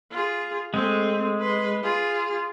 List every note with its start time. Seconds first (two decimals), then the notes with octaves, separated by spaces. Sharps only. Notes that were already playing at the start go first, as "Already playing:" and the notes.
0.12 F4 G#4
0.74 G#3 A3 C4
1.40 B4 C6
1.83 F4 G#4